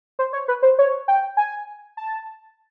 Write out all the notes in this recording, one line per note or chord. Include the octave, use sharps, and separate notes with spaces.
C5
C#5
B4
C5
C#5
G5
G#5
A5